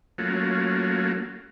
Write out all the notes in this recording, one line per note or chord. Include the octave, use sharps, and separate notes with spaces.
F#3 A3 A#3 C#4 F4 F#4